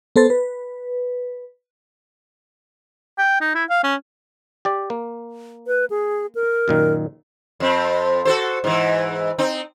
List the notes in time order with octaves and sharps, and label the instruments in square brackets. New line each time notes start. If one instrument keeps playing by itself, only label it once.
[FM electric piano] B3 A4 C5 A6
B4
[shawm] G5
D#4
E4
F5
C#4
[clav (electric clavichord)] G4 D5
A#3
[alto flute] B4
G#4
A#4
[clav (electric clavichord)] F#2 A#2 D#3
[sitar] F2 C4
F#4 A4 C5
G#2 E3
C4 D#4